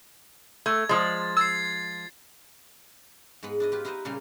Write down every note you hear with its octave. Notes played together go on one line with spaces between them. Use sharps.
A3 G#6
F3 G#3 A6
E6 G#6 A6 C7
G#2 G#3 B3 B5
D4 E4 D#5
F4 G4 B4
D#4 E4 B4 C5 D#5
A#2 C#3 G3 A#3 C6